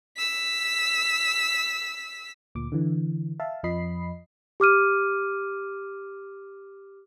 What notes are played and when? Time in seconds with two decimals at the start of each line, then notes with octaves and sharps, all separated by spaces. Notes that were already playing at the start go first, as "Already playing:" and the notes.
0.16 E6 B6
2.55 D2 A#2 D6
2.72 D3 E3
3.40 E5 F5 A5
3.63 F2 F3 D#5 B5 C7
4.60 G4 D6 F6 D#7